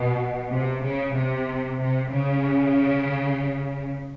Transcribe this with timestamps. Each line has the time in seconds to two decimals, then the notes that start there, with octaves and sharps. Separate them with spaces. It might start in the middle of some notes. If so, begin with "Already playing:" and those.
Already playing: B2
0.49 C3
0.82 C#3
1.15 C3
1.81 C3
2.13 C#3